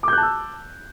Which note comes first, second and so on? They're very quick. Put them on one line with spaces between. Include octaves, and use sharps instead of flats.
D6 G6 F#6 A5 E6